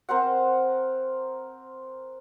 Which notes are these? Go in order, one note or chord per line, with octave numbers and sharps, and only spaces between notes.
C4 A#4 C5 F#5